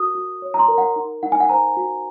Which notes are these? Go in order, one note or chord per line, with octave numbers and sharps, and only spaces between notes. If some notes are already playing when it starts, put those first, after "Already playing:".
Already playing: F#4 A#4 D#6
F#4
C#5
A#5
C6
A#4
F#5
D#4
D#4 F#5
G#5
F#5
C5 A#5
F#4